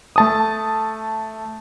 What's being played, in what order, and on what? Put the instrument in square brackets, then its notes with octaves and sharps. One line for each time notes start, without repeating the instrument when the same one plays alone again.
[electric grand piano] A3 A5 D#6